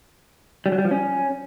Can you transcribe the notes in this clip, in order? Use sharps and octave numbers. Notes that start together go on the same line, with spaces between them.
G3
F#3
G3
F3
C#4